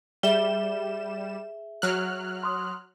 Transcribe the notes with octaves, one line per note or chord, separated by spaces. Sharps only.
G3 G#4 E5 E7 G7
F#3 F6 F#6
C6 D#6